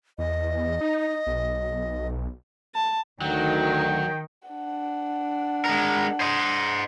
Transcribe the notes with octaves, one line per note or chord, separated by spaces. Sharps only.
E2 D#5
D#4
B1
A5
D2 D#3 F#3 G5
D4 F#5
G#3 A#4
C5 D#5